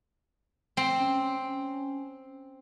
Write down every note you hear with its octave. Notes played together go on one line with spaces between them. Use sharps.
C4
C#4